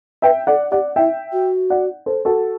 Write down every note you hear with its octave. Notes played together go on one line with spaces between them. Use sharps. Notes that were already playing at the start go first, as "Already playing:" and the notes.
B4 E5 G5
A4 D5 F#5
G4 D5 F#5
E4 E5 G5
F#4
D5 F#5
A4 C5
F#4 A4